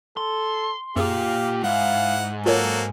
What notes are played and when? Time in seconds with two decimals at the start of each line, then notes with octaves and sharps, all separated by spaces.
0.17 A4 C6
0.96 F#2 A#3 F4 G4 G#4 F5 D6
1.64 G#2 E4 F5 F#5
2.46 F#3 A#3 F4 F#4 A4 A#4 C#5